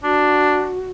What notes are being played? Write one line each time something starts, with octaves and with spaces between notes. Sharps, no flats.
D4 F#4